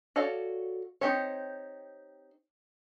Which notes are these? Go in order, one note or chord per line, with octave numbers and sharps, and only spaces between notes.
F#4 A4 C#5 D5 F5
C4 D#4 G4 C5 C#5